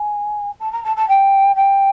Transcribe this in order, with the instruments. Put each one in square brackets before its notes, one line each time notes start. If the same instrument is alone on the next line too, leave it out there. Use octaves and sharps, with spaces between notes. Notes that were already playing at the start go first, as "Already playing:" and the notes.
Already playing: [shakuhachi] G#5
A5
A#5
A5
A5
G5
G5